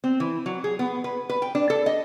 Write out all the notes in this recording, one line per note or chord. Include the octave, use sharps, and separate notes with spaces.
C4
E3
F#3
G#4
B3
B4
B4
G5
D4
A4
D#5